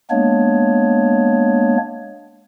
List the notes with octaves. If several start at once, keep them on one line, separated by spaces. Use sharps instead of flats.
G#3 A#3 B3 D4 C#5